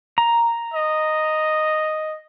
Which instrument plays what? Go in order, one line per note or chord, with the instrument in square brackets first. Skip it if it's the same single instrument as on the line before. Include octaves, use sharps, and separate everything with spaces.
[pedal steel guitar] A#5
[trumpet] D#5